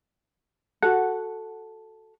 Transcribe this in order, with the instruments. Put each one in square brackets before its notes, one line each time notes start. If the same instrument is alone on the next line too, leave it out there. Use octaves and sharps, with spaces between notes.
[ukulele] F#4 A4 [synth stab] F#5